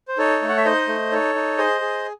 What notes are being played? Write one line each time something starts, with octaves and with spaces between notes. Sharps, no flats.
C5
D#4 A4 C#5
A3
F#5
E5
D#4 C5 D#5
A3
D#4 A4 C#5
D#4
G#4 C5 D#5
G#4